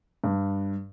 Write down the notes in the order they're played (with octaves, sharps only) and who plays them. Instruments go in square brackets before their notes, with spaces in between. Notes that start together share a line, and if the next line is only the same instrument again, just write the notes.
[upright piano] G2